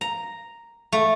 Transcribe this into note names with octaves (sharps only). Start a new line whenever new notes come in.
A#5
A3